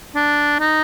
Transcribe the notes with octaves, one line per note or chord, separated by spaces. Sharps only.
D4
D#4